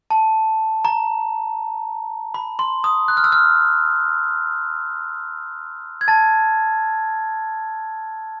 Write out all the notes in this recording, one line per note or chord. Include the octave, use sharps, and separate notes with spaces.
A5
A#5
B5
C6
D#6
F#6
F6
E6
F6
G#6
A5 A6